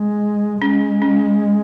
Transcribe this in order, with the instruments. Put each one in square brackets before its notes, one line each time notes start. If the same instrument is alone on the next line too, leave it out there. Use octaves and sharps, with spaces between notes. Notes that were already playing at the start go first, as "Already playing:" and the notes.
Already playing: [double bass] G#3
[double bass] G#3 [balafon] C#4
[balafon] C#4